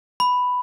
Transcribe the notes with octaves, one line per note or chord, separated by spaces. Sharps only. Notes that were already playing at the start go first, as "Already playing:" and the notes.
B5